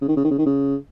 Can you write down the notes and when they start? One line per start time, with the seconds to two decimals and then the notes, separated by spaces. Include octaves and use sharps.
0.01 C#3
0.08 D#3
0.16 C#3
0.24 D#3
0.30 C#3
0.38 D#3
0.46 C#3